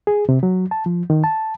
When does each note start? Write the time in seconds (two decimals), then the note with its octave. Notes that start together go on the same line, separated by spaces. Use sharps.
0.07 G#4
0.29 C3
0.43 F#3
0.71 A5
0.86 F3
1.10 D#3
1.24 A5